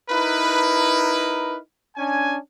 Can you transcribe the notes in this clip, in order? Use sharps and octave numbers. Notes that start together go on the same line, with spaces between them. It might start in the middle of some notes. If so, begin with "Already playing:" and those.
D#4 E4 A#4 B4
C#4 D4 G#5